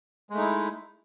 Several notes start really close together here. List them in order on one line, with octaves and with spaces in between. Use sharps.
G#3 A3 D#4 E4